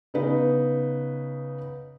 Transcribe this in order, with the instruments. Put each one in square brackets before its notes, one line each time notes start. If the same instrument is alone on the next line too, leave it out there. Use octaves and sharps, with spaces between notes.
[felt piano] C#3 B3 D#4 B4